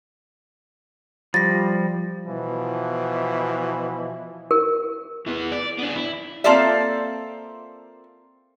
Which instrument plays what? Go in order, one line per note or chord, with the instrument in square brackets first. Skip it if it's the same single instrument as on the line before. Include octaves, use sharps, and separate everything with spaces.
[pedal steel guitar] F3 G3 [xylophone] A6 A#6
[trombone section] B2 E3 F3
[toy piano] A#4
[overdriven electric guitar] E3 B3
D5
B3 D4
E4
[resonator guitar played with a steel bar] A#3 C4 F4 A4 D5 E5